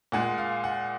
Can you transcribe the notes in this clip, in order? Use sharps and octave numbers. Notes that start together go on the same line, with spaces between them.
A#2 G#3 F#5
F5
F#5